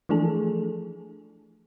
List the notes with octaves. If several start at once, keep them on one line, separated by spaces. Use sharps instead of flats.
E3 F3 A3 D4 G#4 A4